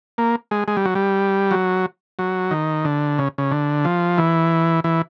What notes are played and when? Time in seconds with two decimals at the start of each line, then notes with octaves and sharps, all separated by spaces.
0.18 A#3
0.51 G#3
0.68 G#3
0.77 G3
0.85 F#3
0.95 G3
1.51 F#3
2.19 F#3
2.51 D#3
2.85 D3
3.18 C#3
3.38 C#3
3.51 D3
3.85 F3
4.18 E3
4.84 E3